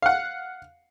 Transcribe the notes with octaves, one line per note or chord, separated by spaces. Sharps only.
F5 F#5